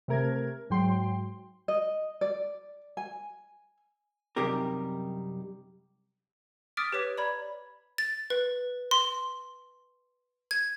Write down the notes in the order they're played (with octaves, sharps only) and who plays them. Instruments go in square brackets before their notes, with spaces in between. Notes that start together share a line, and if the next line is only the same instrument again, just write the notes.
[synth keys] C3 A3 A#4 G#6
G#2 F#3 G5 C6
[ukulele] D#5
D5
G#5
[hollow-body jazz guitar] F#2 C3 G3 D#4 G4 A#4
[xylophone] D6 D#6 F6 A6 B6 D7
G4 B4 C#5 D6 B6
D5 A#5 B5 G#6
A6
B4
C6
G#6